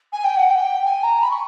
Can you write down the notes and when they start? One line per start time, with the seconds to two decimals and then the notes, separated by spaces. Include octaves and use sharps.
0.13 G#5
0.24 G5
0.37 F#5
0.49 G5
0.85 G#5
1.03 A#5
1.22 B5
1.31 C#6